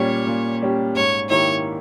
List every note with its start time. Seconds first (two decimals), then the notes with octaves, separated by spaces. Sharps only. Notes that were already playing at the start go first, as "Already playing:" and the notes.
Already playing: A#2 G3 C#4 G4 C#5
0.27 A#2
0.62 G3 C#4 G4
0.95 G#2 C#5
1.29 D#3 A#3 E4 G4 C#5